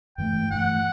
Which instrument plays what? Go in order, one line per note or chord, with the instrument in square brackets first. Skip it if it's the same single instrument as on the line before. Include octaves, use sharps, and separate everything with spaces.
[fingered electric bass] G2 E3 A3 [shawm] G5
[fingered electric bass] G2 E3 A3 [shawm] F#5